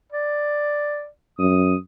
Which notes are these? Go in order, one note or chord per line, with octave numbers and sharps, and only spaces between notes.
D5
F#2 D#6